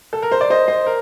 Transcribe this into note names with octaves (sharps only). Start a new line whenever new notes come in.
A4
A#4
C5
D5
C5 D#5
C5 D#5
A#4